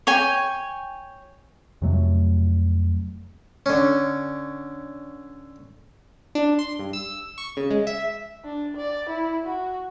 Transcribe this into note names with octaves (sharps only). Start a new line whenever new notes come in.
C#5 G5 G#5
F2 C3 F#3 A3
D3 C#4
D4
C6
G2
E6
C#6
C#3
G#3
E5
D4
D5
E4
F#4